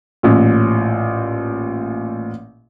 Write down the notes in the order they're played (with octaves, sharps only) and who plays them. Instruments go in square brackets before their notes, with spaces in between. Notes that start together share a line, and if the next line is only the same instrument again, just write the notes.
[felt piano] A1 A#2